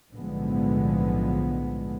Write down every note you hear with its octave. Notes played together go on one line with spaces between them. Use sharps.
B1 A2 D3 F3 G#3 B3